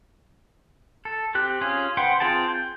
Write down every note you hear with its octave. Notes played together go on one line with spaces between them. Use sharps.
A4
C4 G4 F#6
C#4 F4 G#4
B4 C5 F#5 G5 C6
C4 F4 G#4 G5 A5
G6